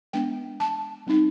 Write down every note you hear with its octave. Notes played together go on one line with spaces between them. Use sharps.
G#3 B3 D4 G5
A5
G3 C4 D#4